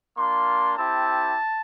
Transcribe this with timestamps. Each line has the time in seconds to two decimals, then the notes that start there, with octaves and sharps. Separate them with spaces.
0.16 A#3 D4 F4 C6
0.77 C4 E4 G4 A5